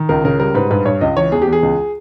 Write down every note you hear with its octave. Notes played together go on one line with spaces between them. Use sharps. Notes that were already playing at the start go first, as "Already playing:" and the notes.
Already playing: D#3
C#2 A#4
C#3 A#4
G3 A#4
G#2 B4
G2 B4
G2 C#5
C#2 D#5
E3 C#5
E2 G#4
G4
E2
G#4
C#2